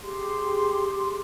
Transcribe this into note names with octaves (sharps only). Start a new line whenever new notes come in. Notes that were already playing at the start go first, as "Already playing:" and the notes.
G4 G#4 C6